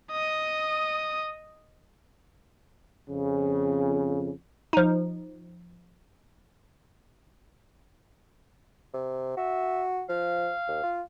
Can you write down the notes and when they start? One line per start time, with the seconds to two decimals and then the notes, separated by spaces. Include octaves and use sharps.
0.12 D#5 D#6
3.08 F2 C#3
4.73 F3 D#4
8.94 C3
9.37 F#4 E5
10.09 F3 F5
10.68 D#2
10.83 F4